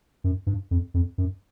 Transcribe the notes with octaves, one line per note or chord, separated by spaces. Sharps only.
F#2
G2
F2
F2
F#2